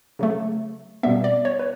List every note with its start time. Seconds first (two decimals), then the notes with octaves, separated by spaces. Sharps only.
0.19 C#3 F#3 A3
1.03 B2 G3 B3 E5
1.24 D5
1.45 C#5
1.59 B4